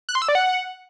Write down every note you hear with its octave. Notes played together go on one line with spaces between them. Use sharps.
F#6
C6
E6
D5
F#5